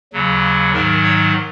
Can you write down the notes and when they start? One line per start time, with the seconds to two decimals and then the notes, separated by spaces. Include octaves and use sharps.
0.12 D#2 C#3 F#3
0.73 G#2 D#3 F#3 A#4
1.04 C#5